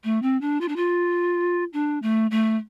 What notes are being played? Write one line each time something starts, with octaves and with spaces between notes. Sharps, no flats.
A3
C4
D4
F4
D4
F4
D4
A3
A3